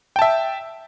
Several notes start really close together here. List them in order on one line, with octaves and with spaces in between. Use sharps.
G5 A5 E5